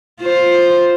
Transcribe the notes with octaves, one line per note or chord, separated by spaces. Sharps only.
F4 C5